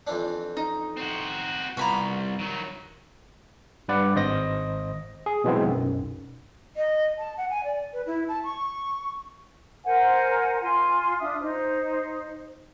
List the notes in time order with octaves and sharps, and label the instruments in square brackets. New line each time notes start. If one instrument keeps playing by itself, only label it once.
[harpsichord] F2 E3 D4
[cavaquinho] D#4
[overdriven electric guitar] C4 F#4
[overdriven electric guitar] C2 [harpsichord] B3 F4 [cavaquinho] A#5 B5 C#6
[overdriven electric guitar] D#3 F#3
[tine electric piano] G2 B4 D5 F#5
G#1 C5 D#5 A#6
G#4
B2 E3 F#3 G#3 B3 C4
B1 F#2
[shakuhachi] D#5
A5
F#5
G#5
D5
B4
E4
A5
C#6
[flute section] A#4 C5 F#5 G#5
F4 G#5 C6
D4 F4 E5 D#6
D#4 C5